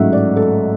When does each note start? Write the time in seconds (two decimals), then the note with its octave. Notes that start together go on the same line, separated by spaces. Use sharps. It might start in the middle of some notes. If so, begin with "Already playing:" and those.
Already playing: A1 G#2 F#3 A3 E5 F#5
0.13 D5
0.36 A4